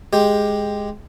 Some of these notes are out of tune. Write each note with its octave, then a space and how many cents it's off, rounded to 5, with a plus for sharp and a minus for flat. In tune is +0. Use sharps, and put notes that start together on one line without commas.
G#3 +0 G4 +10